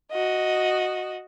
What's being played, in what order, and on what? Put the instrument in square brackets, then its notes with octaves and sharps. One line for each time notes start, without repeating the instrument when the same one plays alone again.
[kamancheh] F#4 D#5